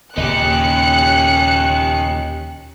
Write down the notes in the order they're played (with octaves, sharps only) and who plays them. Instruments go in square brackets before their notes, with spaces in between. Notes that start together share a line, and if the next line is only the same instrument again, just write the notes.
[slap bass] D#2 A#2 C#3 [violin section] C#4 F#6 C#7 [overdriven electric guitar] D#4 G4